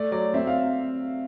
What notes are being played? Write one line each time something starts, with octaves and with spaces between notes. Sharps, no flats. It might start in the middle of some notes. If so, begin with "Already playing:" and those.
Already playing: A3 D5
F#3 D5
C4 E5
F5